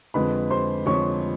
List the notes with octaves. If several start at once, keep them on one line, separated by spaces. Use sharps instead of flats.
F2 D3 F3 G#3 B4 B5
C5 C6
F2 D3 F3 G#3 C#5 C#6